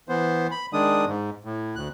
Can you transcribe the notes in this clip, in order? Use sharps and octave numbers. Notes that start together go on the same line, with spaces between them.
E3 B3 C5
B5
D#3 G#3 D4 D#6
G#2
A2
D2 F#6